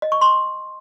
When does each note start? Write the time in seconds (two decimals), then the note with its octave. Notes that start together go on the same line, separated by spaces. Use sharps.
0.02 D#5
0.12 C#6
0.21 C6